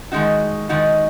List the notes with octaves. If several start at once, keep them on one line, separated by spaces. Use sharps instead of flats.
D#3 G#3 D#4 F#4
D#3 G#3 D#4 F#4